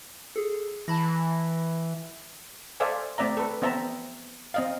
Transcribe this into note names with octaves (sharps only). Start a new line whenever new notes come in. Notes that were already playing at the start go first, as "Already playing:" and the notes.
G#4 A4
E3 A5 B5 A#6
A4 C5 D5 E5 F5 G#5
A3 C4 D5 E5 A#5
A4 B4
B3 C4 E5 A5 A#5
C4 D#5 F5